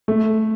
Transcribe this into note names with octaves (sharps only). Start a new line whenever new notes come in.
A3